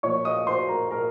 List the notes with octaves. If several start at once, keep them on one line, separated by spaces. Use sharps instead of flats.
A#2 F3 C#5 C#6
D#5 D#6
C5 C6
A#4 A#5
A#4 A#5